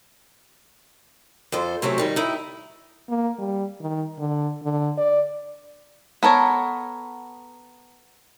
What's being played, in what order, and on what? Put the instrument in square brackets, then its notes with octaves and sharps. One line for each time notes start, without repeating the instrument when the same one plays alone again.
[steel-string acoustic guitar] F2 A4 C5
C3 F#3 A3 C4 C#4
D#3 G3 D#4
D#4 E4 G5
[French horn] A#3
G3
D#3
D3
D3
D5
[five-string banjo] B3 A4 A#4 C#5